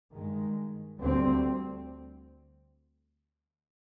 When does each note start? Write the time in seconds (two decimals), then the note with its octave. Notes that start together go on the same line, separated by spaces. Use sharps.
0.13 G2 D#3 G#3
1.00 D2 D3 G3 C4